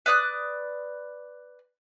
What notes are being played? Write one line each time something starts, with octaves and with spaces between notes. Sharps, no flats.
B4 D5 D#6 F#6